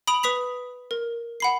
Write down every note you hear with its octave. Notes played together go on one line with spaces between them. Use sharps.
B5 D#6 D7 F7 F#7
B4 D#6 B6 F7
A#4
F#5 B5 C7